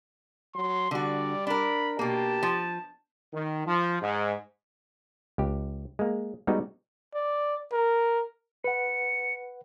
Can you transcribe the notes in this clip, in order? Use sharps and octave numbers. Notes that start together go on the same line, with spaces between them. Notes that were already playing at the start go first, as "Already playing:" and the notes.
F#3 C6
D3 G3 F#4 D5
D4 A#4 B5
B2 A#3 G4 A5
F3
D#3
F3
G#2
C#2 G4
G#3 A#3
G3 G#3 B3 D#4 F#4
D5
A#4
B4 F#5 C#7